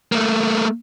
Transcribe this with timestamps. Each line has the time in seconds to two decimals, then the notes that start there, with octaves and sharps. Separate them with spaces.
0.12 A3 A#3